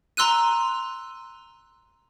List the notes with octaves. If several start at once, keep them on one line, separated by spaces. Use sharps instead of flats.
A#5 C6 E6 F#6 D#7